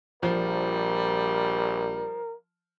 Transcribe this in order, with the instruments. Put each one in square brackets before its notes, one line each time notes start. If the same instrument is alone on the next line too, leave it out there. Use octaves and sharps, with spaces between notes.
[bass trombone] A#1 [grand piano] F3 [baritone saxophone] G3 [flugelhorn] A#4